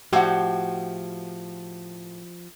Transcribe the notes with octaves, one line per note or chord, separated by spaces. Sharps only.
A2 F3 F#4 G4 F#5